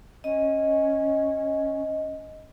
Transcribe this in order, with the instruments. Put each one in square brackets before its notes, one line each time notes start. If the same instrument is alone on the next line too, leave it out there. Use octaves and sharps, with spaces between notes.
[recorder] C#4 [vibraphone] D#5